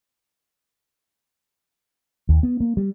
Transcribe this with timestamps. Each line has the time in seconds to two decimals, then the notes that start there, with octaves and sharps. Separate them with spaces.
2.29 D#2
2.43 B3
2.60 A#3
2.77 G3